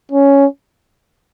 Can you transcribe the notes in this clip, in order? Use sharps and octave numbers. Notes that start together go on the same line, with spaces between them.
C#4